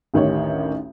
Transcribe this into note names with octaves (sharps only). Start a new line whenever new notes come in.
A1 D2 D#3 D#4 G4 C#5